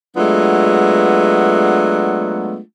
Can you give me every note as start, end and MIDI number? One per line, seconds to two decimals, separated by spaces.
0.17 2.60 54
0.17 2.60 56
0.17 2.60 57
0.17 2.60 59
0.17 2.60 62
0.17 2.60 65